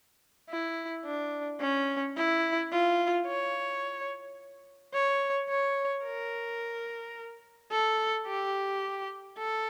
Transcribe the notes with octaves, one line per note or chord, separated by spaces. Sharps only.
E4
D4
C#4
E4
F4
C#5
C#5
C#5
A#4
A4
G4
A4